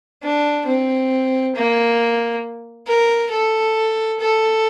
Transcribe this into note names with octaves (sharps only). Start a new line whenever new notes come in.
D4
C4
A#3
A#4
A4
A4